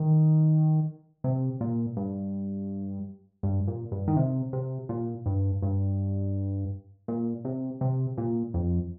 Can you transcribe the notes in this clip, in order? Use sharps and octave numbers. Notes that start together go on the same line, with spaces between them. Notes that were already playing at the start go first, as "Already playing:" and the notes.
Already playing: D#3
C3
A#2
G2
G2
A#2
G2
D#3
C3
C3
A#2
G2
G2
A#2
C3
C3
A#2
F2